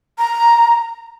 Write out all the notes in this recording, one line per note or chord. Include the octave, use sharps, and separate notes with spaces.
A#5